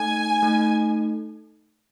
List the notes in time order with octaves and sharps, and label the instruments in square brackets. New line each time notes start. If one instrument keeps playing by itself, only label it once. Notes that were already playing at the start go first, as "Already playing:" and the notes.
Already playing: [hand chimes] A3 D#4 A4 [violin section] G#5
[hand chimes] A3 D#4 A4